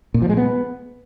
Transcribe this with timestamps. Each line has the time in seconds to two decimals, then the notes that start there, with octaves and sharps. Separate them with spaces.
0.14 A#2
0.22 F3
0.29 G#3
0.37 B3